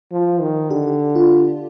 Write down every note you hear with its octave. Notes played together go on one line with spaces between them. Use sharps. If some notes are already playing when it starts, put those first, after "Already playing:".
F3
D#3
D3 G4
F4